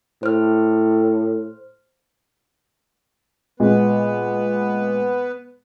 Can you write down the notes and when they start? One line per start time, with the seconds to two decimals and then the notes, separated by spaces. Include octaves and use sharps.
0.23 A2 C5 F6
3.60 A#2 G#3 B3 B4